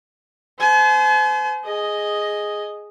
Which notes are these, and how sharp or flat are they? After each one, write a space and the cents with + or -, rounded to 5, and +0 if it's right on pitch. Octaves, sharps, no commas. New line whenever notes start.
C5 -35 G#5 +45
G#4 +0 D#5 +0